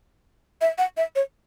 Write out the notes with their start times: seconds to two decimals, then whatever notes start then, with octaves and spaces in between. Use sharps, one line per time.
0.61 E5
0.78 F#5
0.97 E5
1.16 C#5